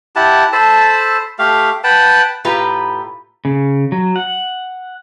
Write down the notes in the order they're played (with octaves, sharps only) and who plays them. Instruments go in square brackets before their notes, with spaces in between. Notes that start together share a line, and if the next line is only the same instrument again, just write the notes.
[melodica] E4 G4 F#5 A5
A4 C5 A5 B5
A3 G4 F5
B4 F#5 G5 A5
[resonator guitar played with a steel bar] A2 F4 G4 B4 A#5
[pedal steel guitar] C#3
F#3
F#5